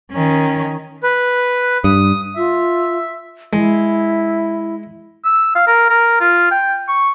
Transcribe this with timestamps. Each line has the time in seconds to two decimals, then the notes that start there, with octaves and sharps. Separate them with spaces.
0.12 D#3 C#4
1.03 B4
1.84 G2 D#6
2.36 F4 E5
3.53 G#3 E4
5.25 E6
5.55 F5
5.67 A#4
5.90 A#4
6.21 F4
6.51 G5
6.88 C#6